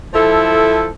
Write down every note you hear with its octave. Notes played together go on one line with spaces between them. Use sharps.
F3 E4 A4